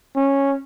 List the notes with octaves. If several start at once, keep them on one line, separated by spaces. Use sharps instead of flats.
C#4